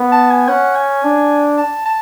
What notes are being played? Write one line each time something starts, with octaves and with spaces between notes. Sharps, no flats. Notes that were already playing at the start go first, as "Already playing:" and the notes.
Already playing: B3
A5
G#5
C#4 F#5
G#5
D4
A5
A5